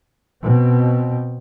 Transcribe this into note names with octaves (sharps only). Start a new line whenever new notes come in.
B2 C4